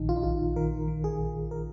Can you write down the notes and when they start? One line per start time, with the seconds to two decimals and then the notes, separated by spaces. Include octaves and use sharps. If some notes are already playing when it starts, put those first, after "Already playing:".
Already playing: A#1 D#3 D#4
0.09 F4
0.16 D#4
0.23 A#1 F4
0.56 D#3 A#4
0.88 D#3
1.04 G#4
1.20 A#1
1.51 A#4